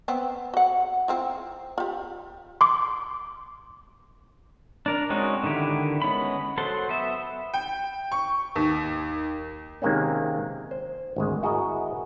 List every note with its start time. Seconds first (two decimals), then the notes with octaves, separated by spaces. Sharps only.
0.08 B3 C4
0.54 F#4 F#5
1.08 C4 E4 F4
1.78 F4 G4
2.61 C6 D6
4.86 D4 A#4
5.10 G#3 C4 C#4 D#4 F#4
5.44 D3 D#3 E4 G4
6.02 G#3 B3 C#4 B5
6.58 F#3 A4 C5 F#5 C6
6.89 B3 E5
7.54 G5
8.12 C#6
8.56 D#2
9.82 C3 D#3 G#3 A#3 C4 C#4
10.71 C5
11.16 G#1 D2 G#3
11.43 E4 F#4 G#4 A#4 D#5